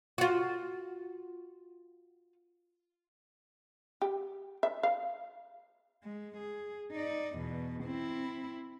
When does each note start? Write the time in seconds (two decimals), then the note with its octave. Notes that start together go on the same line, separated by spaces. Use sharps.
0.18 F4 F#4
4.02 G4
4.63 E5
4.83 F5
6.04 G#3
6.38 G#4
6.92 D#4 D5
7.37 E2 B2
7.84 C4 E4